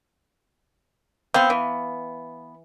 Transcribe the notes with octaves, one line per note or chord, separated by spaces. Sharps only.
B3 C4 F5
E3